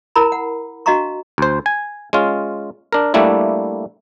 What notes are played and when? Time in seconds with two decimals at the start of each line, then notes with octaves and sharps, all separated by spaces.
0.16 E4 A#4 A#5 B5
0.32 F#5
0.86 D4 F#4 D#5 F5 A#5 C#6
1.38 D2 C5
1.66 G#5
2.13 G#3 C#4 F4
2.93 D4 A#4
3.14 G3 A3 A#3 D4 E4